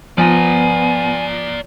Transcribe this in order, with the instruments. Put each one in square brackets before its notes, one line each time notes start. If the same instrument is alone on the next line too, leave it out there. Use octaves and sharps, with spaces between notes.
[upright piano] F3 [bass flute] B3 [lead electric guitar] D5 A#5 [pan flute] G#5